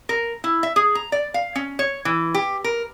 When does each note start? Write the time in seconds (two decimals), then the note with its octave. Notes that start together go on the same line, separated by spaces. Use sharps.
0.09 A#4
0.44 E4
0.63 E5
0.76 G#4
0.95 A#5
1.12 D5
1.34 F5
1.55 C#4
1.79 C#5
2.05 E3
2.34 G4
2.64 A#4